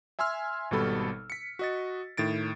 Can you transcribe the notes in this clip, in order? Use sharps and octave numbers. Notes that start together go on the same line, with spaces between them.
E5 G#5 C6 E6 F6
G#1 B2 G3 A4 B5
B6 C#7
F#4 D#5 A6
A2 D#3 A6 D7